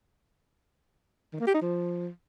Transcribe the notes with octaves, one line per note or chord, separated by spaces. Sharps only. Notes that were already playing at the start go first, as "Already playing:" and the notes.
D#3
A#3
G4
D#4
F3